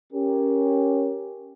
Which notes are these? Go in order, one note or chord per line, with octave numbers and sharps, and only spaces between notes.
C#4 G4 A#4